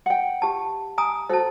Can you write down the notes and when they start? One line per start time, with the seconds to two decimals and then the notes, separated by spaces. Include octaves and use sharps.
0.06 F#5 G5
0.42 G4 A5
0.98 G#5 A#5 D#6
1.29 F#4 A4 C5 A5